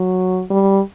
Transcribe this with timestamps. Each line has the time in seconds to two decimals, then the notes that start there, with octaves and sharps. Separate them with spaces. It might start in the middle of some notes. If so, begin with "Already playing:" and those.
Already playing: F#3
0.50 G3